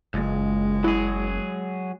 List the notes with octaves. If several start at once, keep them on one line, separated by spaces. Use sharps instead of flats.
F#1 C#2 G#3
F#3 E4 G#4